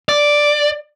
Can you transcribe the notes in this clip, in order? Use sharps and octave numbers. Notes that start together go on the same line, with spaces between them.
D5